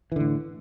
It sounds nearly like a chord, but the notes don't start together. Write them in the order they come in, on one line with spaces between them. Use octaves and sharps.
E3 D3 A2